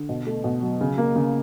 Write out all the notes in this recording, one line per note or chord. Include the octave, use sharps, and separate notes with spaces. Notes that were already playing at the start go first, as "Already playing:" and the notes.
Already playing: D3
B2
A3
B2
F#3
C#3
A#3
C#3